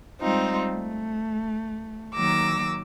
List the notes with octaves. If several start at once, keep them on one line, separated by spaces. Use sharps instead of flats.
G3 G#3 C4 D#4 F4
A3
D#3 F#3 A#3 D6 E6 A#6